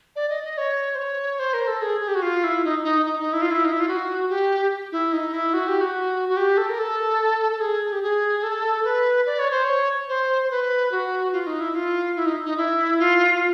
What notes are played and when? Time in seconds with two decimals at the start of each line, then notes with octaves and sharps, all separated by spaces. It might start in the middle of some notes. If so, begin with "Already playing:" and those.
0.16 D5
0.30 D#5
0.44 D#5
0.58 C#5
0.95 C5
0.99 C#5
1.39 C5
1.54 A#4
1.67 A4
1.81 G#4
2.01 G#4
2.08 G4
2.15 F#4
2.22 F4
2.44 E4
2.64 D#4
2.85 D#4
3.06 D#4
3.20 D#4
3.33 E4
3.42 F4
3.51 E4
3.65 D#4
3.72 E4
3.80 F4
3.88 F#4
4.29 G4
4.92 E4
5.13 D#4
5.33 E4
5.54 F#4
5.68 G4
5.81 F#4
6.29 F#4
6.37 G4
6.57 A4
6.69 A#4
6.79 A4
7.52 A4
7.60 G#4
7.92 G4
8.03 G#4
8.43 A4
8.84 B4
9.26 D5
9.39 C#5
9.51 C5
9.64 C#5
10.09 C5
10.44 C5
10.51 B4
10.92 F#4
11.33 F4
11.47 D#4
11.60 E4
11.75 F4
12.16 E4
12.26 D#4
12.45 D#4
12.57 E4
12.99 F4
13.35 F4